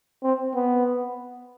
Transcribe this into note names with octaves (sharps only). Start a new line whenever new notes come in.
C4
B3